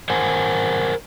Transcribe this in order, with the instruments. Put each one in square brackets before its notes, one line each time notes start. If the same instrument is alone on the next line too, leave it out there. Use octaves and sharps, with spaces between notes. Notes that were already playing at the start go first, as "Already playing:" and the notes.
[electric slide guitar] A#4 C5 F#5 G#5